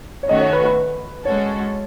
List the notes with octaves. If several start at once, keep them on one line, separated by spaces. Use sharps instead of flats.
C#5
D#3 A3 C#4 F#4 D#5
C#5
B4
B4
G#3 C#4 F#4 A4 C#5